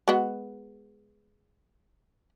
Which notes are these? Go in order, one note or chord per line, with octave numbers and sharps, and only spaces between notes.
G#3 B3 F#4